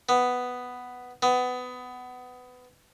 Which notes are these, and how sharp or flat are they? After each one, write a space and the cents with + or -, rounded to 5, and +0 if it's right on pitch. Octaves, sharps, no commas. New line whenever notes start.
B3 +5
B3 +20